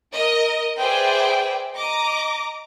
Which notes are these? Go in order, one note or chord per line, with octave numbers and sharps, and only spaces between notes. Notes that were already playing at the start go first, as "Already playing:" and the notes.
A#4 D#5
G#4 B4 C5 D5 E5 G5
D#5 A#5 D6